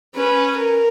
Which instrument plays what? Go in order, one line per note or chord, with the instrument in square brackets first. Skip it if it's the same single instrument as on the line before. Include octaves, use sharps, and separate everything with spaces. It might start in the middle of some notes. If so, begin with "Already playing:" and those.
[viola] C#4 [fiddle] B4
[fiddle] A#4